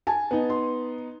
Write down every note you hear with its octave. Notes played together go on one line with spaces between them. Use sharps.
G#5 A5
B3 D#4
C6